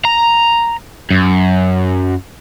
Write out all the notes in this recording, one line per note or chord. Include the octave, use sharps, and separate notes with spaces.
A#5
F#2